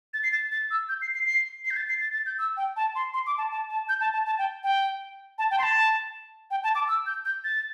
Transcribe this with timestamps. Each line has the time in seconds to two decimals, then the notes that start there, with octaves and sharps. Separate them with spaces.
0.14 A6
0.24 C7
0.32 A6
0.51 A6
0.71 E6
0.89 G6
1.02 C7
1.14 C7
1.26 C7
1.64 C7
1.70 G6
1.77 A6
1.89 C7
2.01 A6
2.13 A6
2.26 G6
2.39 E6
2.57 G5
2.76 A5
2.95 C6
3.14 C6
3.27 D6
3.38 A5
3.51 A5
3.70 A5
3.89 G6
4.00 A5
4.13 A5
4.26 A5
4.39 G5
4.63 G5
5.38 A5
5.51 G5
5.59 C6
5.63 A5
6.51 G5
6.64 A5
6.75 D6
6.88 E6
7.06 G6
7.25 G6
7.44 A6